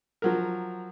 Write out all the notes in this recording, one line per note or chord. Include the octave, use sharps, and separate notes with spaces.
F3 F#3 A#4